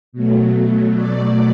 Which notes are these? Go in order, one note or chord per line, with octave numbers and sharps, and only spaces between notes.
B2 F#3 A3
D5